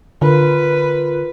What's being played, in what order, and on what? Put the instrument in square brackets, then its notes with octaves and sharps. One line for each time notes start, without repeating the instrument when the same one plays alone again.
[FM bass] D3 [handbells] F4 A#4 [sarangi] B4